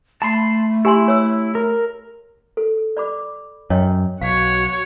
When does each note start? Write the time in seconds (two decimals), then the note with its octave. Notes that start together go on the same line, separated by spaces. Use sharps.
0.22 A3 A5 B5 C6
0.85 E4 G4 G#5 C6
1.08 C#5 E6
1.55 A#4
2.57 A4
2.97 D5 B5 D6
3.70 F#2 C#5 D#5 G5
4.21 B1 F#4 C#5 F5